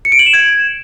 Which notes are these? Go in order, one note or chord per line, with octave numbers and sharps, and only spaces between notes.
C#7
D7
F#7
E7
G#6